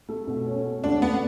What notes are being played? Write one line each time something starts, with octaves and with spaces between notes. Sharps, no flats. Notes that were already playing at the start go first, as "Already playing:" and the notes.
A3
B2
C#4
A3
D2 D4
D2 B3